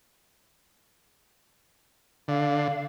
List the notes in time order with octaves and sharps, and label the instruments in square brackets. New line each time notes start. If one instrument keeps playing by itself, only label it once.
[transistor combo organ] D3 [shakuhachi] F5